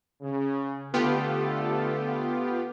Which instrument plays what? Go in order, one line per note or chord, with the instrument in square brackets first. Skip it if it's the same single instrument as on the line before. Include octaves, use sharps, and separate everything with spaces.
[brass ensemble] C#3
[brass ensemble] D3 A3 A4 [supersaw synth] B3 F4 G4